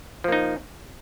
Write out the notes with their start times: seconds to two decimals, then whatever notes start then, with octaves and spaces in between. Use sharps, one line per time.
0.24 F3
0.28 A#3
0.32 D#4